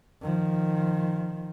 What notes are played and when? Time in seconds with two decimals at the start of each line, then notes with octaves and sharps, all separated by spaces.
0.22 D#3 F3